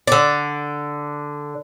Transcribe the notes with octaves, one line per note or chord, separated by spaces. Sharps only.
D3 D5